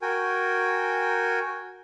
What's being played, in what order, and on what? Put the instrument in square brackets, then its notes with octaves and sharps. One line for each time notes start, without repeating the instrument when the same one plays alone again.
[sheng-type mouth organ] F#4 A#4 G5 G#5